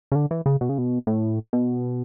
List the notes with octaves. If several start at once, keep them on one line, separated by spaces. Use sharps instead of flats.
C#3
D3
E3
C#3
B2
C#3
B2
A2
B2